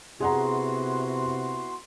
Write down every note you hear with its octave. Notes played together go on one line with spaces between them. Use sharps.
C3 B3 E4 F#4 G#4 F#5 A#5 C6